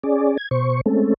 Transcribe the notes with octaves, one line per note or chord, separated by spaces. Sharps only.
C#4 G#4 D5
G#6
B2 C5 C#6
G#3 A3 C4 C#4 A4